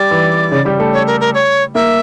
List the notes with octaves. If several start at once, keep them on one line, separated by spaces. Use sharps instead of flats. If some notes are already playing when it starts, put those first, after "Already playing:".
Already playing: G3 G4 D5
E3 E4
C#3 C#4
G3 G4
A3 A4
C#5
A#4
A#4
C#5
A#3 A#4 E5